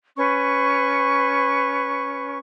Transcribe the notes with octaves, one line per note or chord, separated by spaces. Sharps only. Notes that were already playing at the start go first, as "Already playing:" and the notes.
C#4 B4 C#6